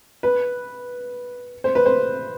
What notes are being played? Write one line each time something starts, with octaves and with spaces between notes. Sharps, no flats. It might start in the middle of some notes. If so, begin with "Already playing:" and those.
B4
C5
B4
C5